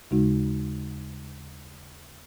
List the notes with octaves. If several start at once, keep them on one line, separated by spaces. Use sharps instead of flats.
D#2 C#3 G#3 D#4 F#4